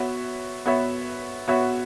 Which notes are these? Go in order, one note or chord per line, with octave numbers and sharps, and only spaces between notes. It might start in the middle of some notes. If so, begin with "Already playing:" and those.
Already playing: B3 F#4 C#5 E5
B3 F#4 C#5 E5
B3 F#4 C#5 E5